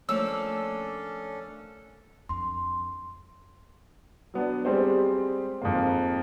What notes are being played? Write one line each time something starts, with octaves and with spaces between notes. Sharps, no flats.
F3 A3 A#3 C#4 D4 A4 C#5 E6
F2 D4 C6
F#3 B3 D4
G3 G#3 C4 G4 C5
F2 G#2 A#3